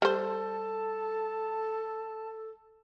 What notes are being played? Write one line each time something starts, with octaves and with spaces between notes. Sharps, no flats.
G3 A4 C5 A5